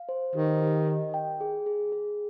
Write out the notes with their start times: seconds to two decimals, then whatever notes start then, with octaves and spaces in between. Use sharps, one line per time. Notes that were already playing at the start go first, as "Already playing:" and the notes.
Already playing: F5
0.09 C5
0.35 D#3 G4
0.61 G4
0.88 D#5
1.14 G5
1.41 G#4
1.66 G#4
1.92 G#4